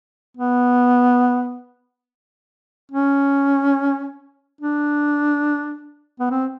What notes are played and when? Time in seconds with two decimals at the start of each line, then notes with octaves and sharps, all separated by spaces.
0.37 B3
2.92 C#4
4.61 D4
6.20 B3
6.31 C4